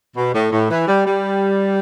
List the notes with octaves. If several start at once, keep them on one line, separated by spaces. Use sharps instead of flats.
B2
A2
A2
E3
G3
G3